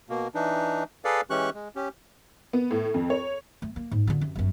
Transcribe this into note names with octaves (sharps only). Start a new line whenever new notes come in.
B2 A#3
E3 D4 D#4
G#4 A4 B4 D5 F5
E3 G#3 C#4 G4 C#6 F#6
G#3
C#4 G4
B3
A2
F2
C#5
A3
A#3
G#2
D3 F4
F#2 C3
G1 F#2